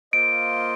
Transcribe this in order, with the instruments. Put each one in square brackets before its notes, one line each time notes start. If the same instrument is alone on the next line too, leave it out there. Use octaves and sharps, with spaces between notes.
[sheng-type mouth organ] A#3 F4 C5 D#5 [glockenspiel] D7